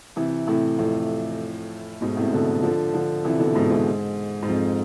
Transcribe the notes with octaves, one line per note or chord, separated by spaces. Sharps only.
C3 E3
A2 C3
F2 A2
G#2 B2
A2 C3
B2 D3
D3 F3
D3 F3
C3 E3
B2 D3
G#2 B2
G#2
G#2
F2